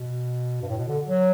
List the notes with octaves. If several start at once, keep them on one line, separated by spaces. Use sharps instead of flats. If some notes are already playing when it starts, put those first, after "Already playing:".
Already playing: B2
G2
A2
B2
D3
F#3